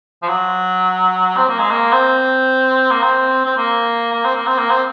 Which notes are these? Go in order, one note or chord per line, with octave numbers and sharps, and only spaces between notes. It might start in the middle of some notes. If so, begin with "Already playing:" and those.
F3
F#3
C4
A#3
G#3
A#3
C4
A#3
C4
C4
A#3
A#3
C4
A#3
C4
A#3
C4